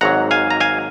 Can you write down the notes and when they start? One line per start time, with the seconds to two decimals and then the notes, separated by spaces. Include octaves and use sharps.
0.01 G#1 G#2 F#3 F#5 A#5
0.31 F5 G#5
0.50 A#5
0.60 F5 G#5